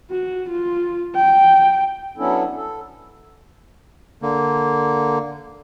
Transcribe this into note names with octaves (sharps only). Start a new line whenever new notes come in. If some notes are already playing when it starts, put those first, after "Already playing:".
F#4
F4
G5
F#3 B3 C#4 D4 E4 A4
A4
D3 A#3